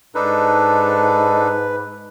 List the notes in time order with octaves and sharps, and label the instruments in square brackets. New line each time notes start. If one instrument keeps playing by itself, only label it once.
[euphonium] G#2 [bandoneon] D4 D#4 A4 [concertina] B4